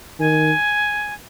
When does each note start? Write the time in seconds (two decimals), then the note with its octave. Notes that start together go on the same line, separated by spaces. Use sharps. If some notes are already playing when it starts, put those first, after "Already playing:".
0.19 D#3 G#5